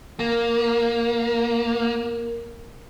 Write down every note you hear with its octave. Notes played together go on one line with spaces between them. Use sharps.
A#3 A#4